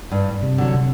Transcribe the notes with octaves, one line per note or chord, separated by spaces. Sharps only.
G2
C3
D3 F#3
C3